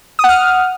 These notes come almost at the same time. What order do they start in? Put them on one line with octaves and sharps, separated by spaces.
D#6 F#5 F6